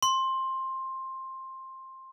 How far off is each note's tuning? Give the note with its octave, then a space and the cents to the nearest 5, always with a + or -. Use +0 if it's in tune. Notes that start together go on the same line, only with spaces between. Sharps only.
C6 +15